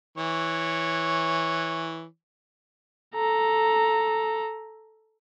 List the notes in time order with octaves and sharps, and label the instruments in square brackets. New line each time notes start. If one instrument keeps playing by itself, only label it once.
[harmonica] E3 C#5
[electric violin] A4 A#5